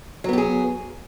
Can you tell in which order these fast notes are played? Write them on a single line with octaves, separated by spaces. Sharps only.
F#3 B3 G4 G#4